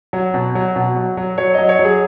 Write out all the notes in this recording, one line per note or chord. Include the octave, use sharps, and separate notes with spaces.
F#3
B2
F#3
B2
F#3
F#3
F#3 C#5
F#3 D#5
C#5
F#3
G#4